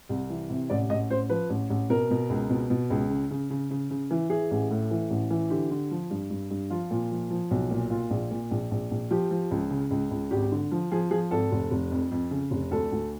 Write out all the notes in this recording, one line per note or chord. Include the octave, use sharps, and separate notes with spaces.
C2
E3
C3
A1 D5
A1 D#5
A1 C5
F3 B4
A1
A1
B2 A#4
B2
C#2
B2
B2
C#2
C#3
C#3
C#3
C#3
C#3
E3
E3 G#4
A1
A2
E3
A1
E3
D3 G4
D3
F3
G2
G2
G2
F3 F4
A#2
F3
F3
B1
A#2
A#2 F4
A#1
A#2
A#1
A#1
A#1
F3 G4
F3
C#2
C#3
C#2
C#2
G#1 G4
D3
F3
F3 G#4
F3 G#4
G#1 A4
F1
F1
F2
F2
C#3
F1
D2 A4
D2